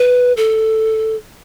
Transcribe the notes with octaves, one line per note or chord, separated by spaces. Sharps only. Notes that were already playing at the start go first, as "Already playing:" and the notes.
Already playing: B4
A4